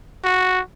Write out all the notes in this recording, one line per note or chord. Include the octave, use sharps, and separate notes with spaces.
F#4